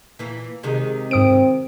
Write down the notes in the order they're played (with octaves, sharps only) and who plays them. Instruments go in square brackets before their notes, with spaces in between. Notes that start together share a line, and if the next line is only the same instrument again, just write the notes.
[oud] A#2 E3
C3 D#3 G#3
[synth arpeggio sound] G#2 D#6 D7 [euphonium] C4